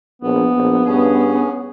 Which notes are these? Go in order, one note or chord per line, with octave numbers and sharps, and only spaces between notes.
A#1 B3
A#1
G2 C#4 G#4